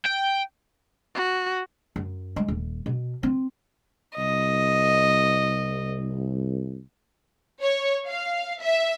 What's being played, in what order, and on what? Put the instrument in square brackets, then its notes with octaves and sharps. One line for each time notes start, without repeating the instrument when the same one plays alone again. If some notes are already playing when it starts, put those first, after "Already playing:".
[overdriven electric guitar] G5
[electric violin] F#4
[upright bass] F#2
G#3
D#1
B2
C4
[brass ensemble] C2 [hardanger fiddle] D#5
[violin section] C#5
F5
E5